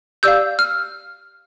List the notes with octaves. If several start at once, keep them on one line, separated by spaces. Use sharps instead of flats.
G4 D5 F5 E6 G6
F6